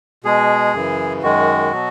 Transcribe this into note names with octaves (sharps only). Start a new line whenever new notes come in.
B2 G#3 G#4
F#2 C#3 E3
F#2 D#3 G#3 F#4
B2 F#3